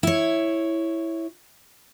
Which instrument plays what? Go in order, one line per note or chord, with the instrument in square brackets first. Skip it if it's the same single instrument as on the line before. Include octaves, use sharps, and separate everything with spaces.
[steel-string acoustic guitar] E4 C#5